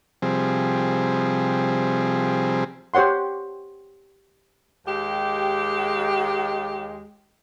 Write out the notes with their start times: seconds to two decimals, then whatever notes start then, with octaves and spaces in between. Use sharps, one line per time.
0.22 C3 F3 G3 C4 G#4
2.94 G4 C5 C#5 F#5 C6
4.86 D#2 G#3 G4